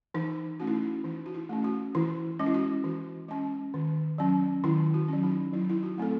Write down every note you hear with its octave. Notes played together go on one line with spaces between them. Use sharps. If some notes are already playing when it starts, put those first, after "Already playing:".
E3 D#4
A3 C#4 F#4
E4
D#4
E4
E3 D#4
F#4
E4
A3 C#4
F#4
E3 E4
G#3 C#4
E4
F#4
E3 F#4
G#3 C#4
D#3
F#3 C#4
D#3 E4
F#4
F#3 C#4
D#4
F#3 E4
D#4
E4
F#4
A3 C4 A4